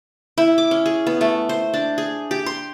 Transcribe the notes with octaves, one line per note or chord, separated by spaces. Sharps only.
E4
D6
C#4
G#4
B3
A3
C5
D4
G#4
G4
C6